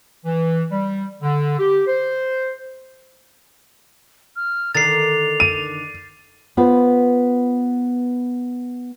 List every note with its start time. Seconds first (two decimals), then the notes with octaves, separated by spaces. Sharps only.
0.25 E3
0.71 G3
1.22 D3
1.59 G4
1.87 C5
4.36 F6
4.75 D3 D#3 A#4 A6 C7 F7
5.40 D#7
6.57 B3 F4 B4 C5